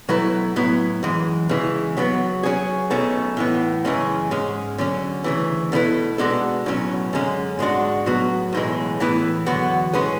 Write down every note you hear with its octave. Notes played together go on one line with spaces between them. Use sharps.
B2 F#3 A3 E4 B4
A2 F#3 B3 E4
F#2 E3 G#3
C#3 E3 G#3
C#3 F#3 B3
F#3 C#4 G#4
B1 B2 A3 C#4
A2 E3 B3
F#2 C#3 E3 G#3 C#4
G#2 G#3 C#4
D3 F#3 C#4
D2 C#3 E3
B2 A3 C#4 E4 B4
B2 G#3 D4 F#4 A4
B1 A2 F#3 C#4
F#2 D3 G#3 C#4
G#2 G#3 D4 F#4
A2 F#3 B3 F#4
B1 A2 E3 G#3
A2 E3 B3 E4 B4
E2 D3 F#3 B3 F#4
A2 G#3 C#4 G#4 B4